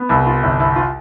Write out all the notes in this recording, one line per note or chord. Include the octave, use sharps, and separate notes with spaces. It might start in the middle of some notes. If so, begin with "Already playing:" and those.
Already playing: B3
C2 E4
F4
G1 E4
E4
F4